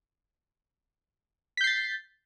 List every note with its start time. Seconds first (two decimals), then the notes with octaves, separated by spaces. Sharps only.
1.57 B6
1.61 G6
1.64 C7
1.67 A6